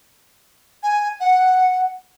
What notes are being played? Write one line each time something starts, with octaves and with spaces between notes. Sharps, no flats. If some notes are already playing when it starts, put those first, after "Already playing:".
G#5
F#5